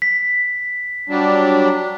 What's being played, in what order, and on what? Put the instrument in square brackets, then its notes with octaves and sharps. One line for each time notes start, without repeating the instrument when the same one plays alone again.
[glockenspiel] B6
[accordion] F#3 G3 D4